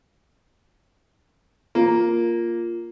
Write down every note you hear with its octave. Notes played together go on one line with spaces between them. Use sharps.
A#3 F4